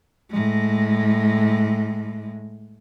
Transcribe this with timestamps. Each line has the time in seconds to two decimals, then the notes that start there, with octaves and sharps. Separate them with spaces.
0.31 A2 G#3